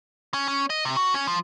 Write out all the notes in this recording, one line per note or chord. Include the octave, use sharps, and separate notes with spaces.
C#4
C#4
D#5
C3
F#4
C#4
F3